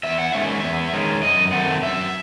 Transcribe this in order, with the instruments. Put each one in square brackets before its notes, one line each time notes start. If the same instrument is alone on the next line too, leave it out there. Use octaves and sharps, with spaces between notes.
[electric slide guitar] E2 E5
F#5
D#3 G#3 C#4 E5
E2
D#3 G#3 C#4
F#2 D#5
D#3 A3 C4 F#5
F#2 E5